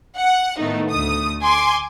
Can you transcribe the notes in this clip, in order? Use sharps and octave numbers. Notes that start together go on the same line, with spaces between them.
F#5
A2 D#3 A3 B3 D#4
D2 D3 A3 D#6
G#5 C6 D6